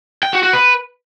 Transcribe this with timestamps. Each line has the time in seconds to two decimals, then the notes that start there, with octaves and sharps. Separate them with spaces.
0.23 G5
0.33 F#4
0.43 F#4
0.53 B4